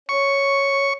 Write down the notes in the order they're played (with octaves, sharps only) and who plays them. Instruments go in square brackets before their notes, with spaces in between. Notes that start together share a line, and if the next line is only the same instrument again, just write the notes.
[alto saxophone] C#5 [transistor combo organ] C#6